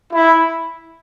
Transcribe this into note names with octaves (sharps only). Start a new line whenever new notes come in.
E4